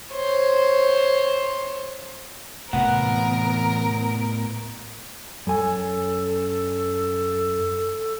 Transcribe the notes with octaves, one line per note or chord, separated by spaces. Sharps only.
C5 C#5
A2 C3 E3 B3 A#4 F#5
F#2 A4 G#5